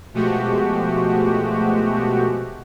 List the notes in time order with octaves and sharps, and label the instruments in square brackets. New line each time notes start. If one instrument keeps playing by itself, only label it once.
[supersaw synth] B2 F3 G#3 A3 F#4 G4